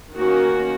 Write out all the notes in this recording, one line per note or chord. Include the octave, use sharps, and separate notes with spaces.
D#3 A#3 C#4 F#4